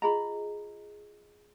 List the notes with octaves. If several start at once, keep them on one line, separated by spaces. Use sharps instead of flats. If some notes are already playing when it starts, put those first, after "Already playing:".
F4 G#4 D#5 A#5 B5